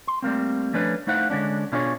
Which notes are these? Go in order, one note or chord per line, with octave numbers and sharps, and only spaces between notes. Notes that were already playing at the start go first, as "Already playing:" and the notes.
C6
G3 A3 A#3 C4
F3 A3 C#4 D4 B4
A3 D#4 E4 C5 F5 F#5
D3 G#3 C#4 D4
B2 D4 E4 F4 G#4 C#5